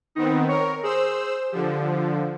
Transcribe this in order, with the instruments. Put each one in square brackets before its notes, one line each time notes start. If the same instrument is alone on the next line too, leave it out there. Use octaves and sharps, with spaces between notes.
[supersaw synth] D#3 B3 C4 [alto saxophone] D#4
[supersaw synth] A#4 [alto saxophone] C#5
[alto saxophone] G#4 [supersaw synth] C5 E6
[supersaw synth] D3 F3 [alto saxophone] G4
[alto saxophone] F4